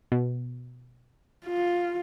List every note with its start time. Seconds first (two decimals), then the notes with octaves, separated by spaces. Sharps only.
0.12 B2
1.45 F4